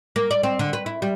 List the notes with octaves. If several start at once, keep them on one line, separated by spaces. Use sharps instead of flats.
A#3
D5
C4
D3
B4
E4
G3